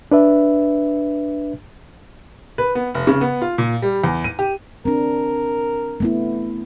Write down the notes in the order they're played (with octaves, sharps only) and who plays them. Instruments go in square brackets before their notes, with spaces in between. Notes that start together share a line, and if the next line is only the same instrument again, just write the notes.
[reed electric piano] D4 B4 E5
[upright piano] B4
B3
F1
C#3
B3
F4
A#2
G3
E2
D#7
G4
[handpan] C4 D4 [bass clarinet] A#4
[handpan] A3 B3 E4